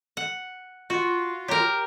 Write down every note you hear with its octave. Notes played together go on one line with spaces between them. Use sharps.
F#5
F4 F#4
G4 A#4 C#5 A#5 F6